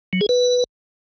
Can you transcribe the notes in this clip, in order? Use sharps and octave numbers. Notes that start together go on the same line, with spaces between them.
F#3
G#4
B4